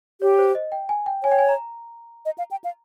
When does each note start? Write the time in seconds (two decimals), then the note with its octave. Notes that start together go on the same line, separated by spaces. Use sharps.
0.21 G4 C#5
0.39 C5
0.55 D#5
0.72 G5
0.89 G#5
1.06 G5
1.23 C#5 G#5
1.32 G5
1.39 G#5
1.49 A#5
2.25 D#5
2.38 F5
2.51 G5
2.64 F5